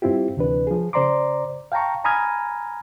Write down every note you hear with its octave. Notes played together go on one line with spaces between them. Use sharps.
G2 C4 E4 F4 G4
D2 C3 E3 D4 B4
F3 G#4
C#3 C5 D5 A#5 C6 D6
F5 G5 A5 A#5 C#6
G#5 A#5 B5 D#6 F6 G#6